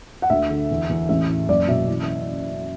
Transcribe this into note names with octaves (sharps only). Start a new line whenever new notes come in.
F#5
D2 E5
D3
E2
E2
A1 E5
A2
F#1 D5
B2 E5
E3